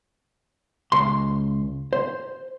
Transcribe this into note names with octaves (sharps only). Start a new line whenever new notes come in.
C#2 C6
C5